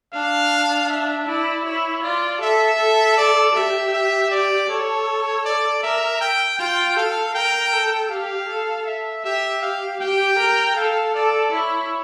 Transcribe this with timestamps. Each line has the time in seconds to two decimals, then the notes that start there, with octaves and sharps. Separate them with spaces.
0.13 D4 F5
0.89 E5
1.27 E4 D5
1.65 E4 C#5
2.03 F4 D5
2.41 A4 E5
2.79 A4
3.17 D5
3.55 G4 E5
3.93 E5
4.31 D5
4.69 A4 C#5
5.45 D5
5.83 A#4 E5
6.21 G5
6.59 F4 G5
6.97 A4 F5
7.35 A#4 G5
7.73 A4
8.11 G4 F5
8.49 A4
8.86 E5
9.25 G4 E5
9.62 F5
10.00 G4 G5
10.39 A#4
10.76 A4 F5
11.15 A4 D5
11.52 E4 C#5